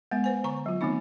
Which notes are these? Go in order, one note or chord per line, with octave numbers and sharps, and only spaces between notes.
G#3 B3 E5
B4 C5 G#5
D3 A#5 C#6
F#3 F4
D#3 A3 B3 C4 D#4